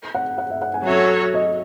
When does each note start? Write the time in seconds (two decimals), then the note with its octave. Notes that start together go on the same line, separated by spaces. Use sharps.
0.15 F#5
0.38 F#5
0.50 E5
0.62 F#5
0.74 G#5
0.86 F#3 C#4 F#4 A4 C#5 E5
1.34 D#5